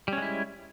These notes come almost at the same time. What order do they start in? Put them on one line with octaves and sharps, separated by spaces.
G3 C#4 G#3 E4